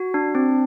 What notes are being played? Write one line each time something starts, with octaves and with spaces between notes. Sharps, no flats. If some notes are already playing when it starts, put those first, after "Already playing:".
Already playing: F#4
D4
C4